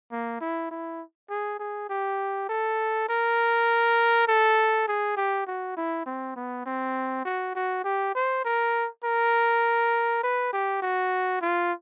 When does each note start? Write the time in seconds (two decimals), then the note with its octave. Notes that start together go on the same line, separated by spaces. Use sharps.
0.11 A#3
0.41 E4
0.71 E4
1.30 G#4
1.59 G#4
1.89 G4
2.49 A4
3.09 A#4
4.28 A4
4.88 G#4
5.17 G4
5.47 F#4
5.77 E4
6.06 C4
6.36 B3
6.66 C4
7.25 F#4
7.55 F#4
7.84 G4
8.15 C5
8.45 A#4
9.04 A#4
10.23 B4
10.53 G4
10.82 F#4
11.42 F4